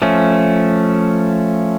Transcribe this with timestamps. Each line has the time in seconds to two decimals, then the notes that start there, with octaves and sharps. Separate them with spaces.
0.02 F3 A3 C#4